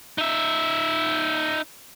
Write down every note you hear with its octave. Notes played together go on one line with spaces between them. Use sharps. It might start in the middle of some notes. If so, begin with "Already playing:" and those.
D#4 E5